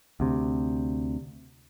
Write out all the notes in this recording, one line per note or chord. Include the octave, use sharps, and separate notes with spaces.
D2 C3